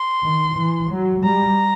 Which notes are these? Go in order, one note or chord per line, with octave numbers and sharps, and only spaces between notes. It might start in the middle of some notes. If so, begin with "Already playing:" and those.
Already playing: C6
D#3
E3
F#3
G3 A#5